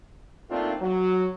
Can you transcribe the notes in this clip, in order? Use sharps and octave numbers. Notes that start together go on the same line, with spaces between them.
A3 A#3 C4 D4 D#4 F4
F#3